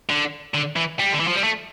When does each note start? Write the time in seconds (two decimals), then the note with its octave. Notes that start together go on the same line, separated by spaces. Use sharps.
0.09 D3
0.55 D3
0.76 E3
0.99 G3
1.12 D3
1.20 E3
1.27 F3
1.35 G3
1.43 A3